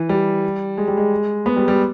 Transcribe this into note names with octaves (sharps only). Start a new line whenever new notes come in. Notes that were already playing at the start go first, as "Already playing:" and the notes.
Already playing: E3
G3
G#3
G3
G#3
B3
G3
G3